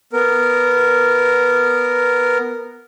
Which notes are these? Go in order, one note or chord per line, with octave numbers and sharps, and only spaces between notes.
B3 A#4